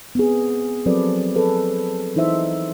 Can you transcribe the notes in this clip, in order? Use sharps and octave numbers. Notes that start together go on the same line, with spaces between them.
B3 C4 G#4
F3 F#3 C4 A4 B4 D5
G#4 A4 B4
E3 D#4 E4 C5 E5